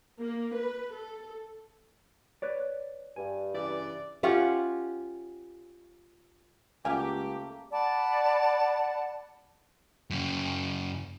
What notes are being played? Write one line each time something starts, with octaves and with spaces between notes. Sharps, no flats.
A#3
B4
A4
B4 C#5 D5
G2 G#5
C#3 E3 G4 D5
C#4 F4 G4 F#5
C#2 F#3 A3 A#3 G4 F5 G#5 A#5
D5 F#5 A5 B5
F#2 C#3